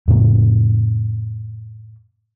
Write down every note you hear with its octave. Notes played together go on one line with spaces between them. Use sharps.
F2 A2 C#3 A#3